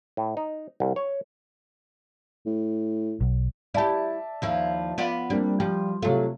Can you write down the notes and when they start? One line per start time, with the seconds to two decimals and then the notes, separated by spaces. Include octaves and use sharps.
0.17 A2
0.37 D#4
0.80 C2
0.96 C#5
2.46 A2
3.21 B1
3.74 E4 G4 D5 E5 A5
4.42 D#2 F3 E4
4.98 B3 F4 D5
5.30 G3 A#3 C4 D4
5.60 F3 G3
6.02 C3 F#3 A3 F4